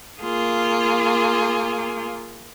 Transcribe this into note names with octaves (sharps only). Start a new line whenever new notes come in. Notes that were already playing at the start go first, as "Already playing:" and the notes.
A#3 F4 G#4